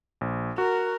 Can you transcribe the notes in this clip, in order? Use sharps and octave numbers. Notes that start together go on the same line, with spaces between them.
A#1
F#4 A#4